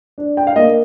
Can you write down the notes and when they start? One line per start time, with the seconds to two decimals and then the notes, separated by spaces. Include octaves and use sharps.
0.18 D4
0.37 G5
0.47 F5
0.56 A#3 D#5